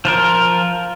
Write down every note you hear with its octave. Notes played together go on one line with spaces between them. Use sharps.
F3 F4 A#4